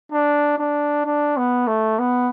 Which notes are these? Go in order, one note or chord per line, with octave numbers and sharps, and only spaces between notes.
D4
D4
D4
B3
A3
B3